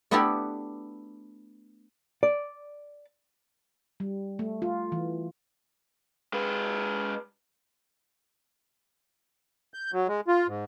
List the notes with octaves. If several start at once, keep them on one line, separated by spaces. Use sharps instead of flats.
A3 B3 D4 E4 F#4 G4
D5
G3
A3
F4
E3
G#3 B4
G6
F#3
G#3
F4
G#2